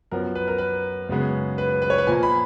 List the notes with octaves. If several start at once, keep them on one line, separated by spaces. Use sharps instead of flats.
F#2 F3 B3 A#4
B4
A#4
B4
F#2 C#3 G#3 B3
B4
B4
C#5
B4
A#2 F3 A#3 G#5
B5